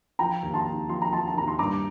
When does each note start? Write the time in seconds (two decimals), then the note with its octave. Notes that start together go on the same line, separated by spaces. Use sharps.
0.19 F3 G5 A#5
0.43 D#2
0.54 A5 C6
0.66 D#2
0.89 F3 C6
1.02 A#5
1.12 F3 A5 C6
1.28 A5
1.36 D#2 A#5
1.48 C6
1.59 G2 A#5 D6